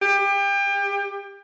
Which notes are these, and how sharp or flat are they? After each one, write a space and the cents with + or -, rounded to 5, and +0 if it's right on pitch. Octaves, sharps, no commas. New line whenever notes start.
G4 +30